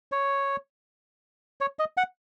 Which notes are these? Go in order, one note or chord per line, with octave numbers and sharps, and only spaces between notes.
C#5
C#5
D#5
F#5